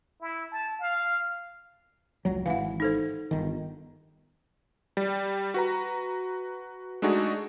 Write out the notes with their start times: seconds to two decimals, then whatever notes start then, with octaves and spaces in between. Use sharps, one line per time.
0.21 E4
0.52 A5
0.80 F5
2.25 F1 C#2 F#3
2.46 G#1 E3 F5 F#5
2.80 D#4 A4 C5
3.31 G1 D#3
4.97 G3
5.54 F#4 B4 A#5
7.02 G#3 A3 D4 D#4 F#4 G#4